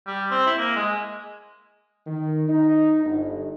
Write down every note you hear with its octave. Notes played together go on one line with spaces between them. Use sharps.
G3
C4
E4
A#3
G#3
D#3
D#4
G1